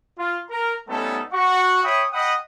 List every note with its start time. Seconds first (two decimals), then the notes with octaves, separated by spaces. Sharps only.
0.18 F4
0.50 A#4 A#5
0.88 G3 A3 B3 C#4 D#4 A4
1.32 F#4 F#5 C#6
1.84 C#5 E5 G5 B5 D#6
2.13 D#5 F#5 G5 B5 D#6